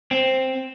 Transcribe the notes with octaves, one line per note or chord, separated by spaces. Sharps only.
C4